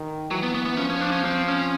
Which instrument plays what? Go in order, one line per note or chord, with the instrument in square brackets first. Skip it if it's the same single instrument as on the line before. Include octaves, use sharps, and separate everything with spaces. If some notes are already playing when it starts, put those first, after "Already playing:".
Already playing: [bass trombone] D#3
[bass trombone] E3 [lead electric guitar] F#3
[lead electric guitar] B3
B3
B3
[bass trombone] F3 [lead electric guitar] C#4
[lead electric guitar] C#4
D4
C#4
C4
C#4